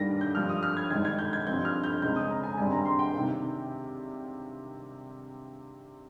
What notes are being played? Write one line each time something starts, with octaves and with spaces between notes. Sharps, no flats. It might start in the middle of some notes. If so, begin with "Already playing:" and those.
Already playing: G2 D#3 G3 A#3 A#6
G6
G2 F3 A#3 F6
D#6
F6
G#6
G#1 G#2 G3 G#6
G#6
G6
G#6
G2 F3 C4 G6
F6
G6
C#2 C#3 G#3 C4 G6
D#6
A#5
G#5
G#1 G2 G3 C4 G#5
A#5
C6
G5
C3 D#3 A#3